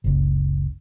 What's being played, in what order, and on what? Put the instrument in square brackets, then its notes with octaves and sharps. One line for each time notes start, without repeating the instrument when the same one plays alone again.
[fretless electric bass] F#1 C#2